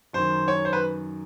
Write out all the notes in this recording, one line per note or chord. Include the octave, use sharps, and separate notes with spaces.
F#2 D#3 C5
C#5
C5
B4